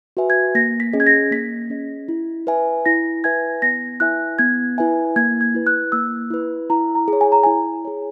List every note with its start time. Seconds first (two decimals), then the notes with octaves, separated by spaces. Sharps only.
0.17 F#4 B4 E5 G#5
0.30 G#6
0.55 A#3 A#6
0.80 B6
0.93 C#4 G#4 D#5
1.00 G#6
1.07 A#6
1.31 A#3 B6
1.70 C#4 G#4 D#5
2.08 E4
2.47 B4 E5 G#5
2.86 E4 A#6
3.24 B4 E5 G#5 G#6
3.62 B3 A#6
4.00 E4 B4 E5 G#5 F#6
4.39 B3 G#6
4.78 E4 B4 E5 G#5
5.16 A#3 G#6
5.41 G#6
5.54 E4 B4
5.67 F#6
5.92 A#3 E6
6.30 E4 B4
6.70 E4 A#5
6.95 A#5
7.08 G#4 C#5
7.21 G#5
7.32 A#5
7.43 E4 G#5
7.85 G#4 C#5